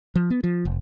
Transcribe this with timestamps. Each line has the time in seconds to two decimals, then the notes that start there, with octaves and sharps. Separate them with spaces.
0.15 F3
0.30 B3
0.44 F3
0.65 F1